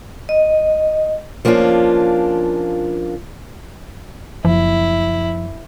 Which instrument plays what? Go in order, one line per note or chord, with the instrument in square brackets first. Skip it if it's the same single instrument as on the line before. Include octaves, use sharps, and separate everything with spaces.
[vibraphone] D#5
[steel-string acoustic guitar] F3 A#3 C#4 D4 F4
[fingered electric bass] F#1 [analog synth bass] F3 [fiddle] E4